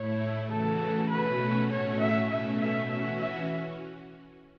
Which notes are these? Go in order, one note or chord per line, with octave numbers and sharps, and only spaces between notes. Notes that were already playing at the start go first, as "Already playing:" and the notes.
Already playing: A2 A3 E4 C#5
C#3 E3 A3 F#4 A4
B2 A3 C#4 F#4 B4
A2 A3 C#4 F#4 C#5
E5
B2 A3 C#4 E5
E5
E3 C#4 F#4 E5
E5